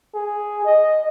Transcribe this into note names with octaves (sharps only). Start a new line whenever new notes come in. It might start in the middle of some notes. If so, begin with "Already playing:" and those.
G#4
D#5